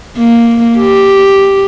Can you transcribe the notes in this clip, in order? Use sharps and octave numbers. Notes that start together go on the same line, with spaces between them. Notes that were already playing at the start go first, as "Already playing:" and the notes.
A#3
G4